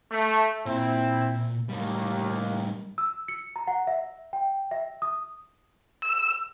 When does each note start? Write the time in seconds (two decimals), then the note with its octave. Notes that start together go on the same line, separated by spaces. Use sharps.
0.11 A3
0.66 A#2 C4 E4
1.69 D#2 A2 G3
2.98 E6
3.28 C#7
3.56 A#5
3.67 F#5
3.87 E5
4.33 G5
4.71 E5
5.02 D#6
6.02 E6